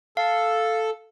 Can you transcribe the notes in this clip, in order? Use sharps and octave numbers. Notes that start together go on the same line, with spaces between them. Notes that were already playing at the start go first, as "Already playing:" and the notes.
A4 F5